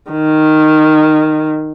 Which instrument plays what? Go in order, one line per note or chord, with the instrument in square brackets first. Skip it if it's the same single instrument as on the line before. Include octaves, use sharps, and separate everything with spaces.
[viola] D#3